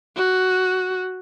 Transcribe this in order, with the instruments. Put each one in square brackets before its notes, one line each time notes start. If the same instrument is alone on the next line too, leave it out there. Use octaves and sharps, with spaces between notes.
[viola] F#4